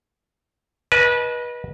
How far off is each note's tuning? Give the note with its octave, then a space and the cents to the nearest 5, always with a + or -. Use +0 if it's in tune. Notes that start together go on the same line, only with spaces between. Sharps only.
B4 -30 D#5 +0 A5 -35